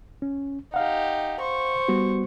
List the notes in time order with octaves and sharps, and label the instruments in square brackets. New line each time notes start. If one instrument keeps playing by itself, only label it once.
[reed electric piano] C#4
[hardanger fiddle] D#4 G4 [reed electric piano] F5 F#5
[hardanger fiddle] C5 C#6
[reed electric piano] G3 B3 F#4